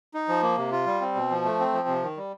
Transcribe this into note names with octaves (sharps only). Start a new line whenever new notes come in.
D#4
F3
A#3
C3
F4
G3
C4
B2
F3
A3
C4
F3
C3
D#3
G3